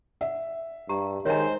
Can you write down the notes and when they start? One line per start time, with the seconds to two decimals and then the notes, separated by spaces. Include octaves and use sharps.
0.21 E5 F#5
0.89 G2 G4 A#5
1.26 D#3 G#3 A#4 C5 C#5 E5 G#5 A#5